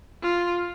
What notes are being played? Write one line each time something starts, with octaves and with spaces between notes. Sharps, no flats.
F4